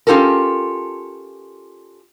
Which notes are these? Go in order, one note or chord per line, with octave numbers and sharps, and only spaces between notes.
C#4 F4 G4 A4 A#4